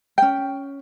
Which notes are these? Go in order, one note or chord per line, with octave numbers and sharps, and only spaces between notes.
C#4 G5